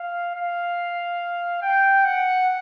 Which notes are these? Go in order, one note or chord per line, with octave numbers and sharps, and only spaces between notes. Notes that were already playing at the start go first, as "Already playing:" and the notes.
Already playing: F5
F5
G5
F#5